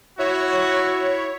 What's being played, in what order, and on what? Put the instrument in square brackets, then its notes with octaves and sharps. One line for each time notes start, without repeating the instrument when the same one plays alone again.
[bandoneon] E4 E5 [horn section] F#4 [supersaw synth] C#5